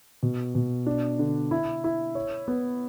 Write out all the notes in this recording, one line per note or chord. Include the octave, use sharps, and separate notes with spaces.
B2
B2
D4
D3
E4
E4
C#5
B3